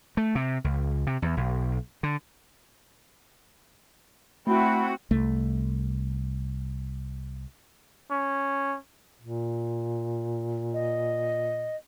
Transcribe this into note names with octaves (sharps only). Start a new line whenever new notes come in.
A3
C3
C#2
C3
E2
B1
D3
A3 C4 E4 F#4 B5
C2 A3
C#4
A#2
D#5